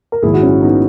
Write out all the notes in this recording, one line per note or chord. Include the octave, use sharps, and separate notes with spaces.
A#4
A#1 G#2 D#3 E4 G#4
F#4
C#4 E4
B3 D#4